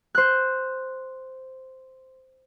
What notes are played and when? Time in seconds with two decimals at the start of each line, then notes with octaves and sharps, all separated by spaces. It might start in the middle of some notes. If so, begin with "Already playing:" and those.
0.15 C5 F#6